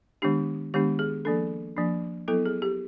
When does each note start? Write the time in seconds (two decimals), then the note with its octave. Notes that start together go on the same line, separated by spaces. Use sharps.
0.22 D#3 G#3 B3 D4 G4
0.74 D#3 G#3 B3 D4 G4
0.99 G#4
1.25 F3 A#3 D4 A4
1.76 F3 A#3 D4
2.28 F#3 B3 E4 A4
2.46 G#4
2.62 G4